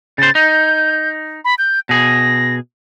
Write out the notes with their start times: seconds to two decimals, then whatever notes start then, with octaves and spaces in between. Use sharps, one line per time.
0.18 C#3 C5 A6
0.35 D#4 G6
1.45 B5
1.58 G6
1.89 B2 G#4 A#6